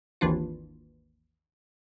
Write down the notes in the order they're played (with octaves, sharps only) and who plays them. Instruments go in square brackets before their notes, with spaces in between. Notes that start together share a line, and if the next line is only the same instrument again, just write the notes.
[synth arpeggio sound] G#1 D#2 E3 D4 F4